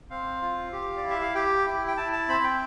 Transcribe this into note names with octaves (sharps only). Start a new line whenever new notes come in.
C4 F5
F4
G4
D5
E4
E5
F5
G4 G5
E4
G5
E4 A5
A5
C4 B5
G5